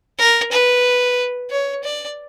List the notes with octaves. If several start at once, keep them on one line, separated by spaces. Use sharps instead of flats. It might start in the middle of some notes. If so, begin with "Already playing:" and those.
A#4
B4
C#5
D5